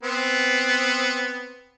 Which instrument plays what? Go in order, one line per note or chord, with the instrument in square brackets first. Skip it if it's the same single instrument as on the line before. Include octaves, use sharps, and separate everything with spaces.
[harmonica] B3 C4